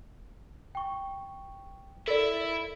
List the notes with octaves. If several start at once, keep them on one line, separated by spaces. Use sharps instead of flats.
G5 C#6
E4 A4 A#4 D5 E5